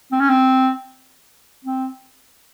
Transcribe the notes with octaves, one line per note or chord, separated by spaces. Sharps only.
C4
C#4
C4
C4